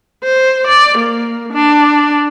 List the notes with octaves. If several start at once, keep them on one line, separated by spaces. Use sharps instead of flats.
C5
D5
A#3
D4